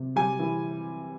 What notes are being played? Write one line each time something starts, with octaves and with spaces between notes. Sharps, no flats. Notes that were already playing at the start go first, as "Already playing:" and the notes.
Already playing: C3
G3 G#5
E3